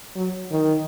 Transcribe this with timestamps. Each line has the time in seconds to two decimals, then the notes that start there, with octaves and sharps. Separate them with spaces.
0.16 F#3
0.51 D#3